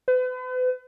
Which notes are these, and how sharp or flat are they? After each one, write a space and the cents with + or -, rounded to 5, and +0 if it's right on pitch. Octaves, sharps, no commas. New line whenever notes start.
B4 +40